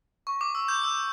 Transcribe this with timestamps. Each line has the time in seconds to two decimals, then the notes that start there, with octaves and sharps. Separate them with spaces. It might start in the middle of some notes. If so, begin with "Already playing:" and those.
0.27 C#6
0.41 D6
0.55 E6
0.68 G6
0.83 E6